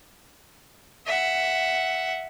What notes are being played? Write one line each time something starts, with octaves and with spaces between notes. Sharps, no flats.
E5 F#5